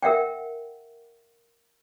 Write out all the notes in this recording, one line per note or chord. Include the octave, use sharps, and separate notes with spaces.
A#4 E5 F#5 G5